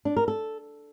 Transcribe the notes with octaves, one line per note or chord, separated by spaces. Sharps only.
D4
A#4
A4